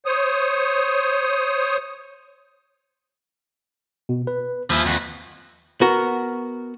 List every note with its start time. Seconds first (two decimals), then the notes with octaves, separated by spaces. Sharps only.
0.06 C5 C#5 D#6
4.09 B2
4.27 B4
4.70 D#2 F3 E4
4.85 F2 F#4
5.81 B3 F#4 A#4